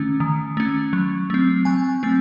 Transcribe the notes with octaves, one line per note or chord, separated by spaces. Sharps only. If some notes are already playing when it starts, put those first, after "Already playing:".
Already playing: D#3 A3 C#4
D#3
A3 C#4
F#3
A3 C4
F#3 G#5
A3 C4